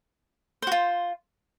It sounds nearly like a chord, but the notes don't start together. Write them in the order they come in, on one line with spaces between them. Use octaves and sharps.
C5 F#4 F4